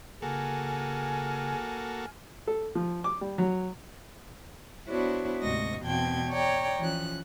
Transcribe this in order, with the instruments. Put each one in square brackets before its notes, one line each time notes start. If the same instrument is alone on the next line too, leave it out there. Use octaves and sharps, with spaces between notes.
[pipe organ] C#3 [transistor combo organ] A#3 F#4 A4 [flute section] G#5 F6
[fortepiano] A4
F3
D6
G3
F#3
[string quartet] B3 D4 E4 F#4 C5 C#5
D2 G#2 C3 D#5 C#6 A#6
E2 B2 C4 G5 A5 G#6
C#5 D5 G5 A#5
E3 F3 C#4 F#6